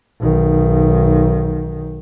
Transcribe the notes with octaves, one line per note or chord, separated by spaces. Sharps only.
B1 D#3